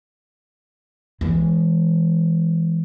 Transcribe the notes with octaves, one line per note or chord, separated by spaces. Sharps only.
E3 G#3